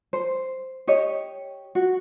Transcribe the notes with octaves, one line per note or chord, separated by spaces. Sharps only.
C5
G4 C#5 D#5
F#4